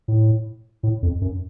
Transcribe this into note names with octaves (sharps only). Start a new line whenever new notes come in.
A2
A2
F2
F#2